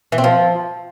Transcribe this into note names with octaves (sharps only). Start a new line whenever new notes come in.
E3
C4
F3